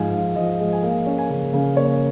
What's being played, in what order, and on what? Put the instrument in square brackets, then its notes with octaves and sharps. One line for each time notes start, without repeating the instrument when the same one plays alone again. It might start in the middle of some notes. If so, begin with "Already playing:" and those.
Already playing: [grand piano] G#2 F3 G#3 F5 G#5
G#2 F5
F3 D#5
G#3 D#5
G#5
A#3 F5
C#4
G#5
C#3
C#3 F5
A#3 C#5